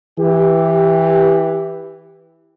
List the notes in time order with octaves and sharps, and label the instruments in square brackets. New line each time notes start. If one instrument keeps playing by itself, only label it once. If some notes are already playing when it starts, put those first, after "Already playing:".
[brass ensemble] E3 G4